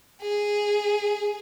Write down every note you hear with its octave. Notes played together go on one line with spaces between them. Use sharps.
G#4